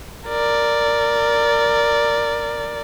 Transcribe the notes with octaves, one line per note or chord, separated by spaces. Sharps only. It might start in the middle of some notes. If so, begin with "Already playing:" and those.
A#4 D5